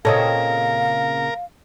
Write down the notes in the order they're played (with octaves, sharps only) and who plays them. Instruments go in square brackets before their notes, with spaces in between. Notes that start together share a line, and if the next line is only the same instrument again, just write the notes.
[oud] A#2 C#3 C4 [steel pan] A4 C#5 D#5 [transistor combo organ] A#4 [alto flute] F5